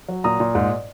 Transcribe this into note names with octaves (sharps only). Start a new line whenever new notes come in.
F#3
A#2 A#5 D#6
A#2
G#2